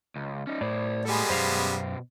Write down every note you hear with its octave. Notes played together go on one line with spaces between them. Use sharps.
C#2
C#4 D#4
A2 C5 D5
G3 G#3 B3 A4 G#5
F#2 B2 C5 F5